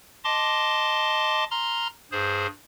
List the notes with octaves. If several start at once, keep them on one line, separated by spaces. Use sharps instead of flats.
D#5 A5 C6 D6
A#5 C6 F6
G2 G#4 C5